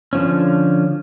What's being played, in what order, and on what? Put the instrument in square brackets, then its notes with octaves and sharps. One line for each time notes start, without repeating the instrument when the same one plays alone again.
[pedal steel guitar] D3 F3 C#4